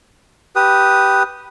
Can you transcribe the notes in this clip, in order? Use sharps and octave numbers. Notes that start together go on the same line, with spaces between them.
G4 B4 D#6